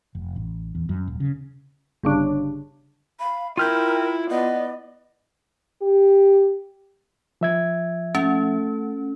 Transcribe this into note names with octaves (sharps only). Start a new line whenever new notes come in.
F1
A1
E2
F#2
D#1
C#3
G1 C#3 D4
F5 B5
E4 F4 A#4 G5 F6 G6
B3 D5 D#5
G4
F3 E5 G#6
A3 C#4